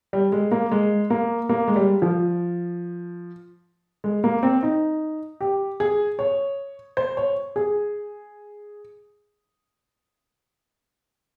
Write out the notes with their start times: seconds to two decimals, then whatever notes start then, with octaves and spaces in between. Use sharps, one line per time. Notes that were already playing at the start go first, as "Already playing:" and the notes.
0.13 G3
0.32 G#3
0.51 A#3
0.72 G#3
1.10 A#3
1.49 A#3
1.68 G#3
1.76 G3
2.02 F3
4.04 G#3
4.24 A#3
4.43 C4
4.63 D#4
5.41 G4
5.80 G#4
6.19 C#5
6.97 C5
7.17 C#5
7.56 G#4